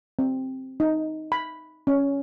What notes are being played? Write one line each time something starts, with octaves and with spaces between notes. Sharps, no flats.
C4
D#4
B5
C#4